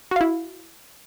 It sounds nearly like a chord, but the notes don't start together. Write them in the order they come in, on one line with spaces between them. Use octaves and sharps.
F#4 F5 E4